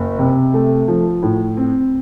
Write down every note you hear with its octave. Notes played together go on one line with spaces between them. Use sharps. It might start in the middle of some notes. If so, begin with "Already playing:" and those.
Already playing: F#1
C3
A3
F3
A2
C4